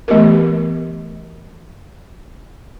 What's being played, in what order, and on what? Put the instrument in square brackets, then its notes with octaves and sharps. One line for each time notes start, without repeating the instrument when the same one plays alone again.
[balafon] E3 A3 B3 G4 A#4